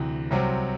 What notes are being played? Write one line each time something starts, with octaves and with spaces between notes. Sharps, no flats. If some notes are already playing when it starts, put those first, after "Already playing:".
Already playing: D2 C3 E3
C2 C3 F#3 C4